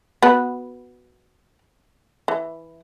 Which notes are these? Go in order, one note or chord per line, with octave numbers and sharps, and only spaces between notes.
B3 F#4 B4
E3